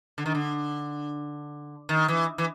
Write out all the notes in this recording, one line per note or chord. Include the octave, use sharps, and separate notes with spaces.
D3
D#3
D3
D#3
E3
E3